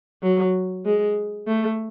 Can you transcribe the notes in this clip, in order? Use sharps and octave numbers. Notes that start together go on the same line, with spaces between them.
F#3
G#3
A3